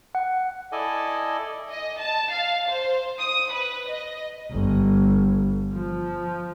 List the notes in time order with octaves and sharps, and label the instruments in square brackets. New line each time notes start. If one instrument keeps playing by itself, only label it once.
[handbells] F#5
[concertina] E4 A4 D5 D#5 G#5
[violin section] D#5
A5
F5
C5
D#6
B4
D#5
[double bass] G1
F3